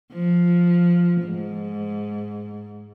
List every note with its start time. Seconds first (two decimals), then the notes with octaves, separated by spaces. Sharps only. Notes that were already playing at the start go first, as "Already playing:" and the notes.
0.13 F3
1.23 G#2